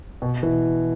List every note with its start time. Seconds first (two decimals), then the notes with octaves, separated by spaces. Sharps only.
0.22 B2
0.43 E3